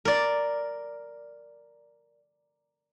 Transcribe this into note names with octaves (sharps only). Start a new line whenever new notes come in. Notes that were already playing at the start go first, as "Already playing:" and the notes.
A#4 D5